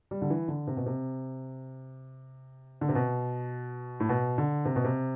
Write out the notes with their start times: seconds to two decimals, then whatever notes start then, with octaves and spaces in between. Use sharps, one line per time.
0.11 G3
0.22 D3
0.30 E3
0.48 D3
0.67 C3
0.77 B2
0.86 C3
2.81 D3
2.89 C3
2.95 B2
4.00 A2
4.09 B2
4.38 D3
4.65 C3
4.76 B2
4.84 C3